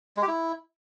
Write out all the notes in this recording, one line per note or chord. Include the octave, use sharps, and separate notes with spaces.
G#3
G4
E4